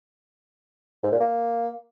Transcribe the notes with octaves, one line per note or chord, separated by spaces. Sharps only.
G#2
A#2
A#3